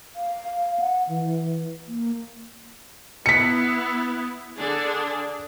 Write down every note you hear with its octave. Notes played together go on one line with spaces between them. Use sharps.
F5
F#5
E3
A#3
B3 E4 B6 C#7
D3 D4 G#4